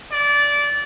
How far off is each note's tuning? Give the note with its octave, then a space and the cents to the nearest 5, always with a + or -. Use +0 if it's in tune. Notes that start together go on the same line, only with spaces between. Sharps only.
D5 -20